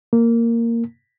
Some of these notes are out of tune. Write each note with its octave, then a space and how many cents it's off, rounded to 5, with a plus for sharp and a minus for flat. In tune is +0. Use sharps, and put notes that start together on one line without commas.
A#3 -10